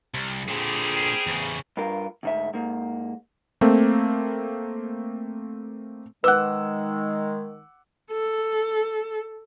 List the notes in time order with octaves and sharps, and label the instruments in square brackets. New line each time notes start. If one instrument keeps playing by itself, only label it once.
[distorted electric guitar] C2
[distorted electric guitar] A#2 D3 [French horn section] G3 C4 G#4
[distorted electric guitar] E2 C#3
[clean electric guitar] G2 F4 A#4
D2 G#2 E5
G#2 A#3
[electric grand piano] A3 A#3 C4
[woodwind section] D#3 G#3 [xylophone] B4 F#6 [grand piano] F#5 D6 E6
[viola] A4